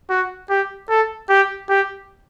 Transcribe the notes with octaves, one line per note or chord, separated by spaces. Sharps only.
F#4
G4
A4
G4
G4